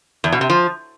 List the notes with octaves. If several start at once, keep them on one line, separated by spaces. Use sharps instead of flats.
E2
B2
C3
F3